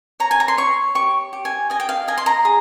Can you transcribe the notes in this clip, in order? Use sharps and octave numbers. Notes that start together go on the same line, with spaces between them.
C#5 A#5
G#5
A#5
C6
C#5 C#6
G4 C#6
G4
G#5
D#5 G#5
G5
F5
D#5 G#5
C6
A#5
G#4